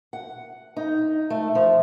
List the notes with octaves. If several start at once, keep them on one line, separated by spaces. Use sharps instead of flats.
F#5
D#4
A3
F3